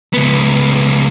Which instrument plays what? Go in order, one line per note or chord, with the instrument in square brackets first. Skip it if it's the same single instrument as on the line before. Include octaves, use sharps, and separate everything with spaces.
[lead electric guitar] C#2 B3